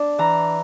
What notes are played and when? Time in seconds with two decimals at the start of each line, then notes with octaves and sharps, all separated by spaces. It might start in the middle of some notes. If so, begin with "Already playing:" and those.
Already playing: D4
0.19 E3 A#5